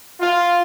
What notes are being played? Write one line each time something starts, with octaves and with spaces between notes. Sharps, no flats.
F4